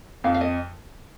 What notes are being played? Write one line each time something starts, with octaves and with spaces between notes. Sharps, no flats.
F2 F5
F5
D#5